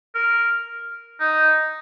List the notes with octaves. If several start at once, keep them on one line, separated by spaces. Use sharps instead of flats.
A#4
D#4